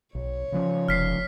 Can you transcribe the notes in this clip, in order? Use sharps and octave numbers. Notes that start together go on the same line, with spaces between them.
B1 C#5
C#3 F3 C#4
F1 F6 B6 C7